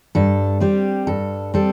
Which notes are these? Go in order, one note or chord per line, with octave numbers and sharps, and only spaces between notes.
G2 A4
G3 C4 G4
G2 A4
G3 C4 A4